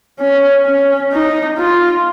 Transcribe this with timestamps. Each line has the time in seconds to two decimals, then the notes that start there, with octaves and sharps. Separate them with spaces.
0.20 C#4
0.66 C#4
1.12 D#4
1.58 F4